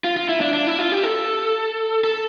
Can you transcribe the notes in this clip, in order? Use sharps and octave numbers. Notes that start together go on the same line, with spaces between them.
F4
F4
E4
D4
D4
E4
F4
G4
A4
A4